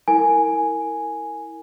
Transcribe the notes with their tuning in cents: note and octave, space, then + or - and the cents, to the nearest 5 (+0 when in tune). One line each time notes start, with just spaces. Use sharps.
E4 -15 A#4 -25 G#5 +0